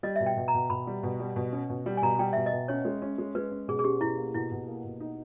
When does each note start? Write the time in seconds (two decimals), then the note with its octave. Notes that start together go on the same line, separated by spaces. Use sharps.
0.03 G3 D#5
0.16 B2 E5
0.26 G5
0.37 B2
0.48 A#5
0.54 B2
0.70 B2 B5
0.87 G3
1.03 B2
1.20 G3
1.36 B2
1.52 C#4
1.69 B2
1.86 G3
1.97 G#5
2.02 B2 A#5
2.19 G3 G5
2.33 B2 E5
2.46 D#5
2.53 B2
2.68 C#4 C#5
2.85 G#3
3.02 C#4
3.18 G#3
3.35 G#3 B4
3.52 C#4
3.68 B2 G#4
3.79 G#4
3.84 C#4 G4
4.01 B2 E4
4.17 A#3
4.35 B2 E4
4.51 B2
4.68 A#3
4.84 B2
5.00 D#4